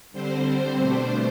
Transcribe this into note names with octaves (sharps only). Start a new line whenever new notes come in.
D3 G3 C4 C5
B2 A3 D4